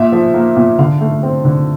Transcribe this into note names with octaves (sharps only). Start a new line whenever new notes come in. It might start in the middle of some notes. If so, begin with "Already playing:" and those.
Already playing: A#2 E5
F3
A#3
A#2
D3 F5
A3
C4
D3